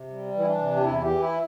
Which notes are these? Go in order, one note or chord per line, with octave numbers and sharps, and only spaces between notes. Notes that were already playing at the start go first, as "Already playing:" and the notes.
Already playing: C3
G3
E3
E4
D4
C3
G4
E2 E4
G4
E3
E4